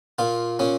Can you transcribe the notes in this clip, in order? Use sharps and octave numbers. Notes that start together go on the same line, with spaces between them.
A#2 F4
A#2 C#4